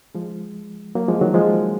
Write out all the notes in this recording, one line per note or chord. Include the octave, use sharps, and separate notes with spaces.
F3 G#3
F#3 A#3
F3 G#3
D#3 F#3
F3 G#3